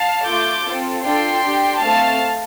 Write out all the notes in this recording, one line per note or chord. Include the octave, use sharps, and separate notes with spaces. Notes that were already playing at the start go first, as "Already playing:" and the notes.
Already playing: F5 A5
A3 F4 A4 D6 G6
C4 F4 A4
D4 F4 A4 G5 C6
D4 G4
A3 C4 A4 F5 A5